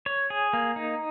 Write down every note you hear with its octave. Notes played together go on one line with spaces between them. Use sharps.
C#5
G#4
A#3
D#4